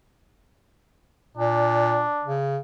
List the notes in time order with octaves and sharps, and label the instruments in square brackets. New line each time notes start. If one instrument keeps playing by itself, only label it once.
[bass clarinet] A#2 [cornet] D4
[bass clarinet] C#3